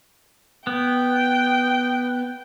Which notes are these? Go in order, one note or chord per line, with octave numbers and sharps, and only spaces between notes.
B3 G5